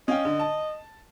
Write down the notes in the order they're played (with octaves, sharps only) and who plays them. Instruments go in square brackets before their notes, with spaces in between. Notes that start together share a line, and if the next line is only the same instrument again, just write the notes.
[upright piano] C#4 F5 G5 [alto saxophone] D#5
[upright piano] D3
A5